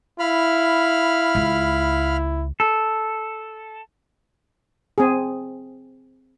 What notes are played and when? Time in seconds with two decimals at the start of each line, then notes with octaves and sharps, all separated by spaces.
0.19 E4 F5 B5 F6
1.35 C#2
2.60 A4
4.98 C4 G#4